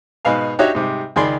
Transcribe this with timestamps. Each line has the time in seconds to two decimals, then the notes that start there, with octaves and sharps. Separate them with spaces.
0.25 G#2 B2 B4 F5 G#5
0.59 D4 D#4 F#4 G4 C#5 E5
0.75 G#2 C3 G3
1.16 C#2 D#3 G#4 D5 B5 C6